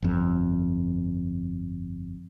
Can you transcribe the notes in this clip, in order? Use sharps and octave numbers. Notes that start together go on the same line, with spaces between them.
G1 F2